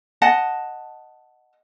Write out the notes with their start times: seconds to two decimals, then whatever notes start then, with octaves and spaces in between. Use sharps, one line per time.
0.22 D#5 F#5 A5